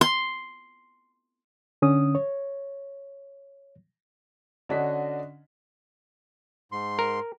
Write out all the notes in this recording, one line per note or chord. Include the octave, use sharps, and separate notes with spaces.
C6
D3 C#4 D#6
C#5
D3 C#4 D4 F#4 D#5 B6
G#2 C6
A#4